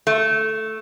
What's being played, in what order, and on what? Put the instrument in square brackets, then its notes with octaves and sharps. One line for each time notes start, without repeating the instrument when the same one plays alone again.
[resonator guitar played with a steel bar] A3